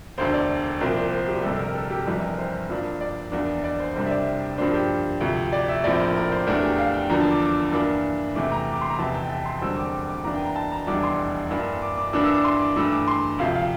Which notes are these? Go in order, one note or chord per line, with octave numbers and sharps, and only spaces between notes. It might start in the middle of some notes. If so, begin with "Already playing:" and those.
E1 D2 D3 C5
D5
C2 A#2 F3 C4
C5
G4
G1 F2 C3 G3 A4
A#4
A4
G4
G1 F2 E3 G3
A#4
C5
G2 F3 A#3 D4
D5
E2 E3 A#3 D4
D5
C5
C2 C3 G3 D4 C5
E5
D5
G2 F3 A#3 D4 C5
G4
D2 C3 F3
D5
E5
A#1 A2 F3 C4 D5
A#4
A#4
C5
E2 E3 A3 D4 A#4
G4
F5
G5
E2 D3 F3 A#3 D4 A#5
A5
D6
D6
D6
G2 E3 A#3 D4
E2 C3 E3 A3 D6
A#5
D6
C6
A#5
F1 E2 C3 E3 A5
G5
A5
C6
E1 E2 D3 G3 C4 E6
D6
D6
E2 E3 A#3 D4 A#5
G5
A#5
A5
A#5
F1 E2 E3 G3 D4 D6
C6
G2 E3 A#3 D4
D6
D6
G2 E3 A#3 D4 D6
E6
D6
C6
D6
G2 E3 A3 E6
D6
C6
D2 C3 F3 F5
F5